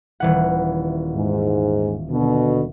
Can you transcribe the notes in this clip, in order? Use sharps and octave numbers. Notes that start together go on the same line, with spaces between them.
D#1 E3 F#5
G#2
B2 D3